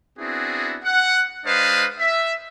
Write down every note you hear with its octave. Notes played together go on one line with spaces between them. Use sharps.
B3 C4 D4 E4 F#4 G#4
F#5
G#3 D4 B4 C5 D#5 F5
E5